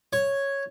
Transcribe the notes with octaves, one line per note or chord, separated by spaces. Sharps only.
C#5